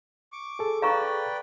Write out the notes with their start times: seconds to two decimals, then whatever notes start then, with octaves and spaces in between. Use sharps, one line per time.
0.32 C#6 D6
0.59 G#4 A4
0.82 B4 D5 F5 G5 A#5 C#6